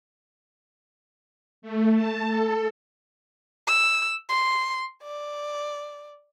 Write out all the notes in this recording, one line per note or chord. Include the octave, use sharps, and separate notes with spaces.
A3
A5
A4
E6
C6
D5